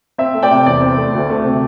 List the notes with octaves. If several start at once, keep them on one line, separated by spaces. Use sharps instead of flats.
C4 E5
A3
D5 G5
C3
E2 D5
C4
A3
D2
A3
C3